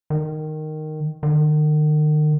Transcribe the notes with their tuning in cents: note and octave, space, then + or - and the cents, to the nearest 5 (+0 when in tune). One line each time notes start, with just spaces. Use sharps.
D#3 -10
D#3 -40